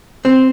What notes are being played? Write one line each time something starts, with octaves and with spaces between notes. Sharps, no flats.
C4